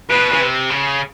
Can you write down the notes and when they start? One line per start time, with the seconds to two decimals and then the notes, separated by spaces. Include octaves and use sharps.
0.10 B2 B4
0.32 C#3
0.41 C3
0.70 C#3